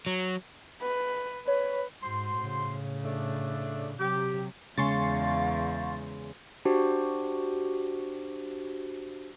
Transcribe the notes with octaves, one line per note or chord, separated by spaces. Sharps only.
F#3
B4
B4 C#5
G#2 F#4 C5 C6
A2 C#3
A3 D4
C3 F#3 G4
E2 C#3 G#3 F5 C6 C#6 A6
D4 F#4 G4 C5